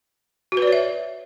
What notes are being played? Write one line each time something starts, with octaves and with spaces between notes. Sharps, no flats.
F#4
B4
D5
C#5
E5